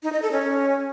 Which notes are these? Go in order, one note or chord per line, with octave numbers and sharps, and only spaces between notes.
D#4
D#5
A4
C#4